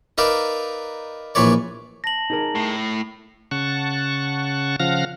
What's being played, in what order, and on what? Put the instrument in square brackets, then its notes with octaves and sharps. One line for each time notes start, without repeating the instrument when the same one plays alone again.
[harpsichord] D#4 A#4 B4 D5 E5 F5
A#1 E3 B4 C#5 D5
[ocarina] A5 [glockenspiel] A#6 F#7
[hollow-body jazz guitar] D#4 G#4 A#4
[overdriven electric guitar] A2
[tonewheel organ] C#3 F#5 A5 C#6
C#3 F3 F5 F#5 F6 A#6